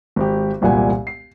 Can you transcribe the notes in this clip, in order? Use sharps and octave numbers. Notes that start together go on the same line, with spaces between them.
G#1 G4
E1 C2 A#2 G3 F#5 G#5
C7